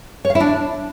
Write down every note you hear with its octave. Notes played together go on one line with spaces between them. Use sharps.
C#5
F5
E4
D4